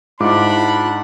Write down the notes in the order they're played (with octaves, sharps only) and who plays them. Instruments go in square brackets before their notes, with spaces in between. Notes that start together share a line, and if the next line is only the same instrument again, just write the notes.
[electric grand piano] G#2 D6 [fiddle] D4 F#5 [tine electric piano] E4 F4 [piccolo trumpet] B5